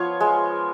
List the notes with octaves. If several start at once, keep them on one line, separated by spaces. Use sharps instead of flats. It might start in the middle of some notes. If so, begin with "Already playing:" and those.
Already playing: F3 B3 F4 C#5
G#3